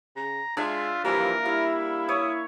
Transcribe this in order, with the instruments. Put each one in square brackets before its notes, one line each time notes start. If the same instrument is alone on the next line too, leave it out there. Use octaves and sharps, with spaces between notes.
[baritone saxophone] C#3 [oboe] A#5
[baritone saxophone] G#3 [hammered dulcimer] D4 E5 F5 [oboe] F4
[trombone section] E3 F3 [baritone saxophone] G3 [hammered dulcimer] A#3 [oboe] A#4
[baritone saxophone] G3 [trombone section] E4 [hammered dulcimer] F5
[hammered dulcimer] C#5 [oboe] D#6